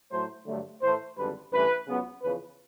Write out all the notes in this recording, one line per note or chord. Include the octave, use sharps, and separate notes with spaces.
A2 F#3 A3 C5
G2 D3 F#3 A3
A2 E3 A3 C5
G#1 F#2 D3 G3 B4
A1 G2 E3 A3 B4
C#2 C#3 F#3 B3
E2 C#3 F3 B4